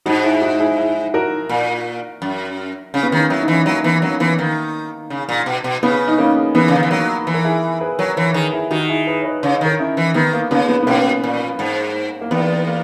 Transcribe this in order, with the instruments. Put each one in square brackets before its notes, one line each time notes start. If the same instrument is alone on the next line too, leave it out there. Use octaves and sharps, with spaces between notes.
[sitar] G#2 [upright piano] D#4 F#4
[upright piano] E4 G#4
E4
D#4 F#4
E4 G#4
E4 G#4
F#4 A#4
[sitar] A#2
F#2
[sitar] C#3 [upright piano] C#4
[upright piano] B3
[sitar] D#3 [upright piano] A#3 C#4
[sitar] F#3 [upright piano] E4
[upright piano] D#4
[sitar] E3 [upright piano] C#4 E4
[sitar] F#3 [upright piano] A#3 C#4
[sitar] E3 [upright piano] B3
[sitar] F#3 [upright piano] A#3 C#4
[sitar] E3 [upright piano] B3
[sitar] D#3 [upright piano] A#3
[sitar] C#3
A#2
B2
B2
[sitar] C#3 [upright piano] B3
[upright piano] D#4
A#3 C#4
[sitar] E3 [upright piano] B3
[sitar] C#3
D#3
E3
[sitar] F#3 [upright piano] A#3
[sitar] E3
[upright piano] A#4
E4 G#4
G#4 B4
[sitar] F#3 [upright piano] A#4 C#5
[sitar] E3 [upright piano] A#4 C#5
[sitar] D#3 [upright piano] G#4 B4
[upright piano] E4 G#4
[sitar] D#3 [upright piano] D#4 F#4
[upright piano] E4 G#4
G#4 B4
C#5
B4 D#5
[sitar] C#3 [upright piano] C#5
[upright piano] D#5
[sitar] D#3 [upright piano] A#4 C#5
[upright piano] C#4 E4
[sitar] E3
[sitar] D#3 [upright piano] B3
[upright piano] A#3
[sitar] C#3 [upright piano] B3
[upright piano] B3
B3
[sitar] B2 [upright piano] A#3 C#4
[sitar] A#2
G#2
[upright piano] A#3
[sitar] E2 [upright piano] B3
[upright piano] A#3